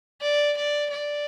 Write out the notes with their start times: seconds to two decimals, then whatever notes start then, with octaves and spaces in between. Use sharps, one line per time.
0.22 D5
0.56 D5
0.90 D5